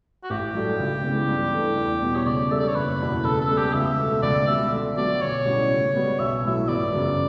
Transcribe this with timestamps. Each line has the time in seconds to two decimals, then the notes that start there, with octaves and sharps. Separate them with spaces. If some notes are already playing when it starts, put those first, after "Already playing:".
0.24 F#4
0.30 A1 G4
0.54 G2 F#3 A3
0.79 C#2
1.04 C#3 E3 B3
1.29 G2
1.53 E3 A3
1.77 E2
2.02 B2 G3
2.16 C#5
2.26 C#3 D5
2.51 G3 D4 A4 E5
2.60 D5
2.68 C#5
2.75 F#1 B4
3.00 E2 B2 G3
3.25 C#3 A4
3.41 A4
3.50 G3 B3
3.58 G4
3.74 C#2 E5
3.98 B2 A3
4.23 C#2 D5
4.47 B2 G3 E5
4.72 D3
4.97 F#3 B3 F#4 D5
5.21 B1 C#5
5.45 A2 G3 C#4 F#4
5.71 C#3
5.95 G3 B3 F#4 B4
6.19 B1 E5
6.44 A2 F#3 E5
6.68 G1 D5
6.92 F#2 C#3